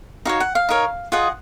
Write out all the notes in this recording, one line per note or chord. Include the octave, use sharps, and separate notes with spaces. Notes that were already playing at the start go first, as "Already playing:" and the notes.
D#4 F#4 C#5 F5
F#5
F5
D#4 A#4 C#5
F4 G#4 D#5 F#5